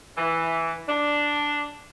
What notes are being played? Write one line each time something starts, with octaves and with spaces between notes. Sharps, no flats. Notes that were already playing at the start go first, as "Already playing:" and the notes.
E3
D4